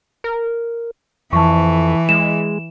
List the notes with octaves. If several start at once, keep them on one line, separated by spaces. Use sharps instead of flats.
A#4
F2 E3 A5 C#6
G#3 E7